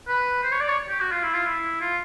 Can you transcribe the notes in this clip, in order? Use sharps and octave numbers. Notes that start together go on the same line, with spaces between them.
B4
C5
C#5
D5
C#5
G4
F#4
F4
E4
F4
E4
F4